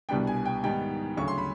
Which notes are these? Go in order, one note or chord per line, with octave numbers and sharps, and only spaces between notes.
C2 B2 G3 B3 D4 G5
G#5
G5
G#2 D#3 G3 B3 G5
D2 C#3 F#3 C#6
C6
B5